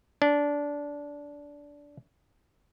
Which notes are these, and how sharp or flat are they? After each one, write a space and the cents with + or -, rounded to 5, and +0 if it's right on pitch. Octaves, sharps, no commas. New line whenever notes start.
D4 -15